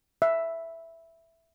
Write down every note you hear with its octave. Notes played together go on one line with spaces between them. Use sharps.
E5